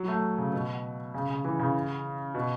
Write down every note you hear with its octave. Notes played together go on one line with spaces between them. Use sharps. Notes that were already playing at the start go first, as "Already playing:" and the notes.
Already playing: F#3
A3
C#3
B2
C#3
C#3
E3
C#3
B2